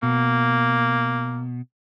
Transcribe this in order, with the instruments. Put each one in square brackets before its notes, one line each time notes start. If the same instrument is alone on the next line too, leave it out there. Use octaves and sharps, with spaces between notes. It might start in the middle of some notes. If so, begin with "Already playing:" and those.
[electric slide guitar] B2 [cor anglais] A#3